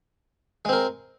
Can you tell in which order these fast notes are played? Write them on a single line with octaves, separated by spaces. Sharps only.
G#3 C4 A#4